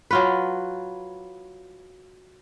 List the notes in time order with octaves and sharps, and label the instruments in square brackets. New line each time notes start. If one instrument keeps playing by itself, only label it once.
[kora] F#3 F4 B4